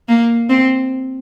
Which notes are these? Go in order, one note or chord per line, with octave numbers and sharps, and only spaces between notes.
A#3
C4